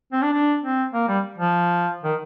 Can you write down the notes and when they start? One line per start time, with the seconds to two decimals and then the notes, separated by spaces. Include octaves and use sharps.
0.12 C4
0.22 D4
0.32 D4
0.63 C4
0.93 A#3
1.08 G3
1.38 F3
2.03 D#3